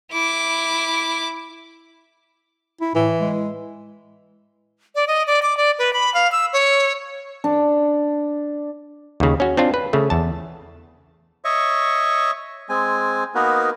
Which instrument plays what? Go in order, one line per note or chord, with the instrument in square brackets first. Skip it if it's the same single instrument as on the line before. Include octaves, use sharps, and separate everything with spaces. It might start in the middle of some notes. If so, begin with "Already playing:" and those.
[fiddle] E4 D6
[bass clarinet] E4
[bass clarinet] A2 [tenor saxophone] E3
[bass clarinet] G#3
[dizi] D5
D#5
D5
D6
D5
B4
B5
F5
E6
C#5
[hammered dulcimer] D4
[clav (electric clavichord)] D#2 C#3
C#4 F#4
C4 D4 F4
B4
C#3 A3
E2 A5
[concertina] C#5 D#5 E5 C#6
G#3 C4 G#5
A#3 B3 D#4 F#4 A#4 B4